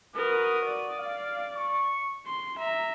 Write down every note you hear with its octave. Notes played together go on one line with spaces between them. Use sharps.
F#4 A#4 B4 D#6
D5
F5
C#6
C6
E5 A#5